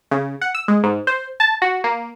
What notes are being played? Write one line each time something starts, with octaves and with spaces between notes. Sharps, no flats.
C#3
F#5
E6
G#3
G#2
C5
A5
F#4
A#3